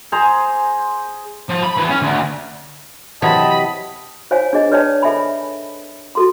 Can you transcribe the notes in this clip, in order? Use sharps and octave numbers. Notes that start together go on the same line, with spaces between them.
G#4 C5 A#5
F3
B5
E3 B3
C#4
D2
C3 E3 F#3 D#5 A5 B5
D#4 C5 C#5 F5 G#5
D4 G#4 D#5
B4 C#5 D5 G5 A5
A4 E5 G#5 B5
F#4 A4 C6